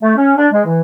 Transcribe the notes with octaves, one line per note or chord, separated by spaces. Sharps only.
A3
C#4
D4
G#3
E3